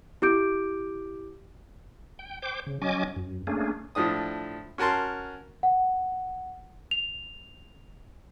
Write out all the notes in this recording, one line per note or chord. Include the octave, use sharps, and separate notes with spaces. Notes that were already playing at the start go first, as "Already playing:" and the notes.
E4 G4 D6 G6 D7
G5
C5 G5 D6
C#3
F#3 C#4 D#5 G#5 D6
F#2
A3 A#3 C#4 D4 G#4
A2 F3 D4 D#6
C#4 F#4 A#4 A5 C6
F#5
F7